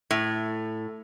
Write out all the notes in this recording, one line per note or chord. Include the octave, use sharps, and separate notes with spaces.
A2